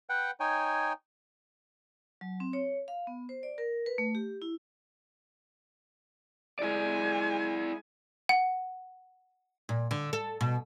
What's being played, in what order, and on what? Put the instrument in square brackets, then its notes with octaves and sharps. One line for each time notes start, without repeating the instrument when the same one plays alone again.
[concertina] B4 F#5 G5
D#4 C#5 G5 G#5
[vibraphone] F#3
C4
C#5
F5
B3
C5
D5
A#4
B4
A3
G4
E4
[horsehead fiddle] G#3 G#5 [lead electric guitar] E4 D5
[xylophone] F#5
[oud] A#2
D3
A4
B2